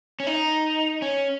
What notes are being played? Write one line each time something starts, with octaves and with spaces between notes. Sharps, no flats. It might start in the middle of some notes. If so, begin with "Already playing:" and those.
C#4
D#4
C#4